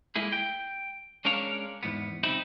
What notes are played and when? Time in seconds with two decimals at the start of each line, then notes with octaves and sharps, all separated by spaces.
0.16 G#3 A#3 E4 G#4
0.32 G5
1.25 G#3 C#4 D4 A#4 C#5 F5
1.83 E2 G#2 B3
2.23 C#2 F#3 C4 D#4 E5 B5